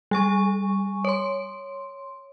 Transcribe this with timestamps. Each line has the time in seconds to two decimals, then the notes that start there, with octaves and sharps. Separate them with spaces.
0.11 G3 G#5 C#6
1.05 C#5 C6